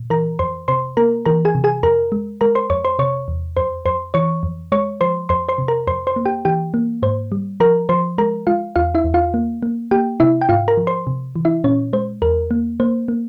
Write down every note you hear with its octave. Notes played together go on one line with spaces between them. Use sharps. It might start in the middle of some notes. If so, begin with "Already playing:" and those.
Already playing: A#2
E3 A#4 A#5
F2 C5 C6
C3 C5 C6
A#3 A#4 A#5
E3 A#4 A#5
G#4 G#5
C3
G#4 G#5
F2 A#4 A#5
G#3
G#3 A#4 A#5
C5 C6
F2 C#5 C#6
C5 C6
C3 C#5 C#6
E2
F2 C5 C6
F2 C5 C6
E3 C#5 C#6
F2
G#3 C#5 C#6
F3 C5 C6
F2 C5 C6
C5 C6
C3
A#4 A#5
F2 C5 C6
C5 C6
A#3
G4 G5
E3 G4 G5
A#3
G#2 C5
G3
F3 A#4 A#5
F3 C5 C6
G#3 A#4 A#5
G#3 F4 F5
E2 F4 F5
E4 E5
E2
F4 F5
A#3
A#3
A#3 G4 G5
C3 E4 E5
G5
G#2 F4 F5
A#4 A#5
F3
C5 C6
C3
E3
E4 E5
A#2 C#4 C#5
G#3 C5
E2 A#4
A#3
A#3 C5
A#3